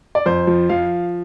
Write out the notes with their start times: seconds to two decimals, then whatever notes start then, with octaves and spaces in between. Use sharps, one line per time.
0.15 D5
0.26 F2 C5
0.47 F3
0.69 F3 F5